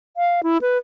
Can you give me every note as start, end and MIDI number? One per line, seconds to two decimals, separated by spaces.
0.17 0.41 77
0.43 0.57 64
0.61 0.78 71